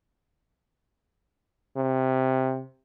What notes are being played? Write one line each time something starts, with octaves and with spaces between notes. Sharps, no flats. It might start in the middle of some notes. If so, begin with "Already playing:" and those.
C3